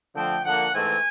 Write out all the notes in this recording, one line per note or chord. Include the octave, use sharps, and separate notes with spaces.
D3 F3 A3 C4 G5
D3 F3 A#3 F#5
G#2 E3 A3 C4 G#5